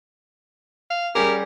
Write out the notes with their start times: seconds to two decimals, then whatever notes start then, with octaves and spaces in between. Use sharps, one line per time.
0.90 F5
1.15 G3 C#4 G4 G#4 A#4